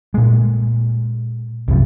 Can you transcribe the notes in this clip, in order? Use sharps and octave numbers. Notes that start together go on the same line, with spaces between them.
A#2 G#3
C2 F#2 C3 F3